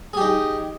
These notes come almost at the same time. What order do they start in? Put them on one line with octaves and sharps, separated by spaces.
G#4 G4 D#4